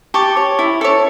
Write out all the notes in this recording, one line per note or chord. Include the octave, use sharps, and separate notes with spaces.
G4 A5 C#6
C#5
E4
A4 C#5